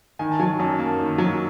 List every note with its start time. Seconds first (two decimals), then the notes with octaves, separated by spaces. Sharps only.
0.19 D#3 G#5
0.31 A5
0.39 F#3 G#5
0.59 F#2 A5
0.79 A#3 A5
0.99 D#3
1.18 F#3